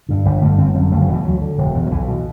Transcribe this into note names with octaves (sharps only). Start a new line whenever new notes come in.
G2 D3
G1 G3
G2 D3 A3
G1 C4
F#2 D3
F#1 A3
F#3
E2 B2 D3 E3
D2 F#3
D3
E1
E2 B2
F#3
B1 E3
B2